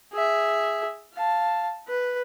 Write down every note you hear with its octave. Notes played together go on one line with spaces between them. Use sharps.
G#4 E5
F5 A5
B4